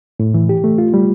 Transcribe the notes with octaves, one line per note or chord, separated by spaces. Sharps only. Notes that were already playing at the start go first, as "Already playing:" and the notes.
A2
E3
G4
A3
F4
G3